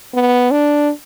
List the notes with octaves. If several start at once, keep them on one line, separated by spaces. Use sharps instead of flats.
B3
D4